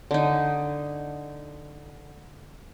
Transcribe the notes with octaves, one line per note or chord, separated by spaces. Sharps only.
D3 D#4